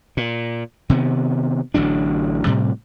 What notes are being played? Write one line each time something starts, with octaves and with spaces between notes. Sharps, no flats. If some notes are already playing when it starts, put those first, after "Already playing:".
A#2
C3 D#3 B3
A1 D3 F#3 D4
A2 C3 G3